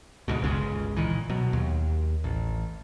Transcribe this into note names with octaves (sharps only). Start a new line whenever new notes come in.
D2 G#2 B2
G1 C#2 C#3 G#3
A#2 D#3 E3
B2 F#3
D#2
A1